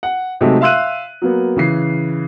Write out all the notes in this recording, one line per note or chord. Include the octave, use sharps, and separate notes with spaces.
F#5
C3 F#3 G#3 A3 D#4 G4
E5 F5 C6 E6 F#6 D#7
F#3 A#3 B3
C#3 E3 C7